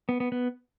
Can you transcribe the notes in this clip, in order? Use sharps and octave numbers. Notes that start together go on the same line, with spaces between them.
B3
B3
B3